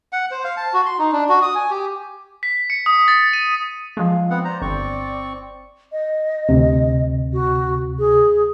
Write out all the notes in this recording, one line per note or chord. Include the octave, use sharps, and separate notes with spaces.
F#5
C5
F5
A5
F#4
C6
D#4
D4
F#4
D#6
G#5
G4
B6
C#7
D#6
A6
D#7
F3 G#3 F5
B3 C4 F#5
C5 D5 A#5
G1 C4 C#6
D#5
D2 C3
F#4
G#4